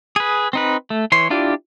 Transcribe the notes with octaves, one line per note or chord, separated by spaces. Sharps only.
G#4 B4
C4 D#4 B4
A3
E3 C#5 C6
D4 E4 F4 G4 D5